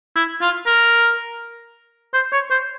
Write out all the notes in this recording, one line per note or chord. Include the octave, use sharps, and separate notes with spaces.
E4
F4
A#4
C5
C#5
C5